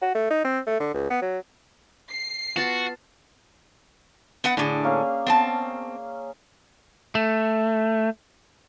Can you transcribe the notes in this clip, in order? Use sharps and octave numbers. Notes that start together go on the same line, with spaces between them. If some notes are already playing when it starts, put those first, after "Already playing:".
F#4
A3
D#4
C4
A3
D3
C#2
B3
F#3
C7
B3 F4 F#4 A5
B3 B4 F#5
A2 D3 D4 G#4
A#3 C#4 F5
B3 C4 A5
A3